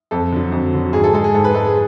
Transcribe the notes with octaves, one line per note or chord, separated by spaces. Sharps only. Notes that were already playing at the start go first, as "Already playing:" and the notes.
F2 A4
D3 F#3
F2
D3 F#3
G#2 G#4
A4
G#3 A4
G#4
G#2 A4
B4
G#3 A4
G#4